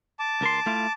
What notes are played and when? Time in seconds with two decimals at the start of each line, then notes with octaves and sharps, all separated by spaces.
0.19 A5 D6
0.41 C#2 A#4 C6
0.66 A3 E4 F4